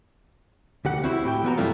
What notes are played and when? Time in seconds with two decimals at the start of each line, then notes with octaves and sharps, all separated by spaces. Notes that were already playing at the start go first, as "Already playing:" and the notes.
0.85 D2 G4 F#5
1.03 C4 E4 F#4 G4
1.24 A2 G4 G5
1.43 E3 B3 F#4 A#5
1.57 F#2 C3 G3 A3 E4 F4